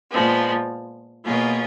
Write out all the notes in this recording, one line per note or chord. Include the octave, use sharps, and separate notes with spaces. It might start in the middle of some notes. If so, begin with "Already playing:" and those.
A#2 F3 G#3 B3
B2 A#3 F4 G#4 C#5